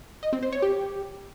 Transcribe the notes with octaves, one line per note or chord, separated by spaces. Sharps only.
D#5
C4
C5
C#5
G4